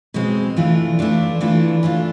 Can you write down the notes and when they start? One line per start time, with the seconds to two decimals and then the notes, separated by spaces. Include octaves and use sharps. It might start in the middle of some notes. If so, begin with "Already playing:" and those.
0.14 B2 G#3 C4
0.56 E3 A3 D4 F4
0.99 E3 A3 D4 F4
1.41 E3 A3 D4 F4
1.83 E3 A3 D4 F4